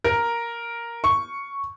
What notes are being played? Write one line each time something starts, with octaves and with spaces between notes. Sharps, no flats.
A#4
C#6